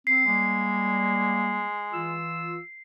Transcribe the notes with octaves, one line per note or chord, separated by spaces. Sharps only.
C4 C7
G3 G#3 A#3
E3 F4 E6